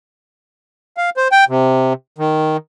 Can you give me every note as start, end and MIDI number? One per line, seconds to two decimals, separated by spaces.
0.97 1.10 77
1.17 1.28 72
1.32 1.44 79
1.49 1.93 48
2.18 2.57 51